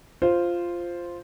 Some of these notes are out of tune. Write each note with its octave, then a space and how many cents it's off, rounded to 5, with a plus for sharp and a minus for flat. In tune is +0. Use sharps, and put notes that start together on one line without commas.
F4 -5 C5 +0